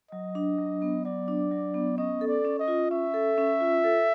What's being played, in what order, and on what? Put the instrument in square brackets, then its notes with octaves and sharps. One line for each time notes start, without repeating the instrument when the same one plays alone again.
[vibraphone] F#3 [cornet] D#5
[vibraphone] D4
F#3
B3
[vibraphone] F#3 [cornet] D5
[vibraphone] D4
F#3
B3
[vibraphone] C#4 [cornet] D#5
[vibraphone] A4
[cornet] D5
[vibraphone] C#4
[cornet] D#5
[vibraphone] F4
[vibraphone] C#4 [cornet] E5
[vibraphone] A4
C#4
F4
A4